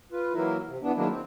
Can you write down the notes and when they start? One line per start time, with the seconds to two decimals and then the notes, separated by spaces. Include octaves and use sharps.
0.12 F4 B4
0.33 E3 F#3 A#3 E4 A#4
0.67 C3
0.82 E3 B3 D4
0.96 D#3 F#3 G#3 A#3 D4 E4
1.10 C4